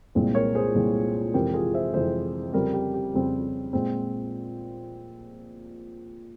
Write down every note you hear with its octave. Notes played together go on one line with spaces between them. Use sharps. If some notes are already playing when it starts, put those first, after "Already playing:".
C2 A#2 G#3 C4
A#4 C#5
G#4 C5
C2 A#2 G#3 C4
F2 C3 E3 G#3 C4 G4 A#4
F4 G#4
C5 E5
F2 C3 E3 G#3 C4 G#4 C5
F2 C#3 G3 C4 G4 A#4
G4 A#4
G4
F2 C#3 G3 C4
A#2 G#3 C4